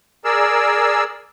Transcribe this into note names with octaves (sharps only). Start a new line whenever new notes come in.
G#4 A#4 D5 E6